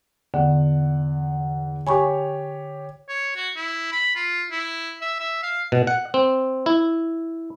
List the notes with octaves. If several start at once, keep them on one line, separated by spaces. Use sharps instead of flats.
E2 D3 F#5
G4 C#5 G#5 B5 C#6
C#5
F#4
E4
B5
F4
E4
E5
E5
F5
B2
F#5
C4
E4